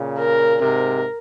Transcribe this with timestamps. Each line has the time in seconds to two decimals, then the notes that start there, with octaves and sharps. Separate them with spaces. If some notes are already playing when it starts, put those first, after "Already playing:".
Already playing: A#2 C#3
0.19 A#4
0.61 G#2 C3 A#4